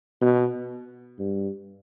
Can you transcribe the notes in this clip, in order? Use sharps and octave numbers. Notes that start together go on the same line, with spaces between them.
B2
G2